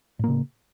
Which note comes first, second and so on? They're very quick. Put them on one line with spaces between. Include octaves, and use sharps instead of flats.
A2 A#3 C#3